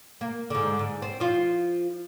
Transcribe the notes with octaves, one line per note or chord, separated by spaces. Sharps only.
A#3
G#2 D3
G#2
C4
F3 F4